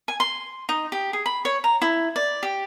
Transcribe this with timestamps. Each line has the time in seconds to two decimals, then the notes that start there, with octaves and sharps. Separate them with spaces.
0.08 G#5
0.20 C6
0.69 D#4
0.92 G4
1.13 G#4
1.26 B5
1.45 C#5
1.64 A#5
1.82 E4
2.16 D5
2.43 G4